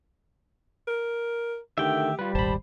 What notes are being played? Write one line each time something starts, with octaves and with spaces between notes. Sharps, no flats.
A#4
D3 D#3 A3 G4 E5 G5
G3 F4 B4
D#1 G#1 C5 A5 B5